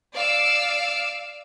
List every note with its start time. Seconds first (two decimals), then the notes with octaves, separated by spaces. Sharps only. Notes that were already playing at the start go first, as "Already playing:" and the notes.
0.17 D5 F5 E6 D7